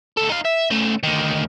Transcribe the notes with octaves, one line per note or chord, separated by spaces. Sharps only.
D2 A4
D#4 F5
E5
C#3 A3
D2 D#3